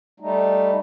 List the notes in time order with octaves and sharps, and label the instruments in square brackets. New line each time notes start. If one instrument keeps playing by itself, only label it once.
[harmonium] G3 A3 D#4